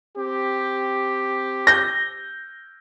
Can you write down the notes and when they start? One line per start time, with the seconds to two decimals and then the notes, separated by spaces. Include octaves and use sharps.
0.16 C4 G4
1.67 G6 A#6